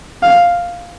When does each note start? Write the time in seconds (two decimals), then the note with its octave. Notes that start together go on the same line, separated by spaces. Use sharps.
0.23 F5